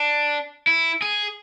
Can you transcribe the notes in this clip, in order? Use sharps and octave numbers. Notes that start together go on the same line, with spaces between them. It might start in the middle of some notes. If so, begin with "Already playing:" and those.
Already playing: D4
E4
G#4